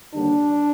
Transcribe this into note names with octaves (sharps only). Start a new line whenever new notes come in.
D#2 D3 G3 D4